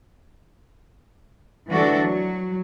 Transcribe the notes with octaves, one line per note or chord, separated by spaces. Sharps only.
D2 E3 G3 D4 F#4 A4
F#3